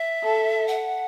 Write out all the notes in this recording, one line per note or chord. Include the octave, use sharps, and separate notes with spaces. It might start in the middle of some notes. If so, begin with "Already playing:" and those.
Already playing: E5
A4
F#5